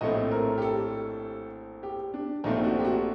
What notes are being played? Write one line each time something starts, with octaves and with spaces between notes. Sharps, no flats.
A#1 A2 A3 C4 D#5
A#4
G4
A4
G4
D4
A#1 A#2 A3 C4 D#4
F#4
G4
F#4